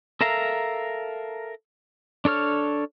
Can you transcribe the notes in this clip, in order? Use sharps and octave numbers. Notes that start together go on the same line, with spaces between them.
A4 A#4 E5 F5 A#5
D4 A4 C#5 F6